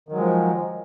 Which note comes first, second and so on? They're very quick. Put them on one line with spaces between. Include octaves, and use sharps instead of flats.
D#3 F#3 G#3 F3